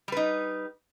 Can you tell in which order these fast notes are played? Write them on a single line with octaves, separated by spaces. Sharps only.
G3 B4 D#4